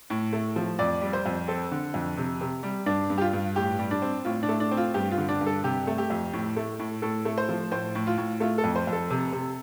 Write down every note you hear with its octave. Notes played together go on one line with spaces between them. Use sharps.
A2
A3
F3
F2 D5
G3
C5
F2
C4 A4
D3
F2
C3
C3
G3
G2 D4
G2
G4
F4
G2
A2 G4
G3
D4
C4
A2 F4
D4
A3
D4
C4
F4
G2 G4
F4
D3
D4
G2
A4
C3 G4
A3
G4
F2
A2
A3
A2
A2 A4
A3
C5
F3
A2 C5
A2
F4
A2
A3 F4
A4
F2
C5
F2
A4
C3
C3